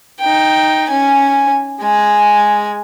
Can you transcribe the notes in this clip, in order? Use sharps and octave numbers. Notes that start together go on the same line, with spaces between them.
D#4 G5
C#4 G#5
G#3 G#5